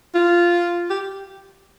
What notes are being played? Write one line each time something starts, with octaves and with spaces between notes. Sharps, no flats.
F4
G4